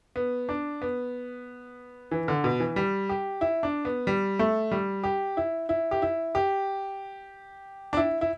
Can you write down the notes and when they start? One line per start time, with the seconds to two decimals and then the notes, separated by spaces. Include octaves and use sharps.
0.16 B3
0.49 D4
0.82 B3
2.11 E3
2.28 D3
2.44 B2
2.60 E3
2.76 G3
3.09 G4
3.41 E4
3.63 D4
3.85 B3
4.07 G3
4.39 A3
4.71 G3
5.04 G4
5.37 E4
5.69 E4
5.91 G4
6.02 E4
6.35 G4
7.93 D4
7.97 E4
8.21 E4